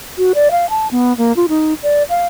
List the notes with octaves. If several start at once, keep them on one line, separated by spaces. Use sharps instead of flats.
F#4
D5
F5
A5
B3
A#3
F4
D#4
D5
F5